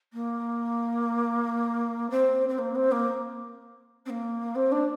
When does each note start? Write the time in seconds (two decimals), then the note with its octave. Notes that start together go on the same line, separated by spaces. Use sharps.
0.13 A#3
2.10 C4
2.48 C4
2.58 A#3
2.75 C4
2.91 A#3
4.06 C4
4.10 A#3
4.55 C4
4.71 D4